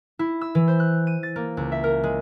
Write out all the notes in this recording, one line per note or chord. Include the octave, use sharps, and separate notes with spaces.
E4
E6
E3
C5
F#6
D#7
A6
A#3
C#2
E5
A#4
G#3